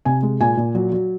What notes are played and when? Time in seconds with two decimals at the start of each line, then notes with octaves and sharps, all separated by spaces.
0.05 C3 G#5
0.23 G#3
0.40 A#2 G#5
0.57 A#2
0.75 F#3
0.92 F#3